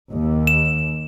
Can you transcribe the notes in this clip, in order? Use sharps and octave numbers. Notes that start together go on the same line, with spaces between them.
D#2
E7